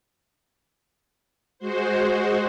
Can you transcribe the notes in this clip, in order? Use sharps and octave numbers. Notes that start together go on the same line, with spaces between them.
G#3 F#4 C5